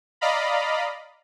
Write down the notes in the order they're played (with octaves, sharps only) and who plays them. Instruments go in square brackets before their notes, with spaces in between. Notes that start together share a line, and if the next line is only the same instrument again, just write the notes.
[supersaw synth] D5 D#5 F5 A#5 B5